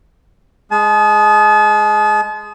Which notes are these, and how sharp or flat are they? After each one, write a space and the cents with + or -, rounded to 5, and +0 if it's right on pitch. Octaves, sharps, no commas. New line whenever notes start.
G#3 +0 A5 -45